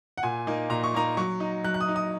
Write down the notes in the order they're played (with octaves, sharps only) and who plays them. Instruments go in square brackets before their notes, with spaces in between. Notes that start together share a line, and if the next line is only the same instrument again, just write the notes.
[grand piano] F#5
A#2 G#5
A#3 D#4
A#2 A#5
C#6
A#3 D#4 A#5
F#3 C#6
D#4
F#3 F#6
F#6
D#6
D#4
D#6